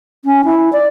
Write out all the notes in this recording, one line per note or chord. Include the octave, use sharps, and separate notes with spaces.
C#4
E4
D5